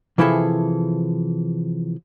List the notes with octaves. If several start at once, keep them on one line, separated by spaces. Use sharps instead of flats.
C3 E3 F3 E4 G#4 A4